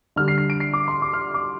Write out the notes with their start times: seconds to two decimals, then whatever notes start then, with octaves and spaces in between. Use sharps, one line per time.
0.16 D3 G3 D4 F6
0.28 C7
0.38 C7
0.50 D7
0.60 C7
0.73 D6
0.88 C6
1.02 D6
1.13 F6
1.34 D6